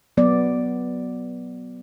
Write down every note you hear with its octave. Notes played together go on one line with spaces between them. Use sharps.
F#3 B3 D5